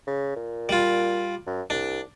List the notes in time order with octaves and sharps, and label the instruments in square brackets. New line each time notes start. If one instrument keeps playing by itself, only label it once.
[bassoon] C#3
A#2
[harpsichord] G3 F4
[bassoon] F#2
[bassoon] C2 [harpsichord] D4